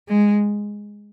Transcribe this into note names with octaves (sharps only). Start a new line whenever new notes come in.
G#3